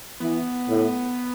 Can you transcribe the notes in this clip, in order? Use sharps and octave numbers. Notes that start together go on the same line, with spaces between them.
E3 B3
A2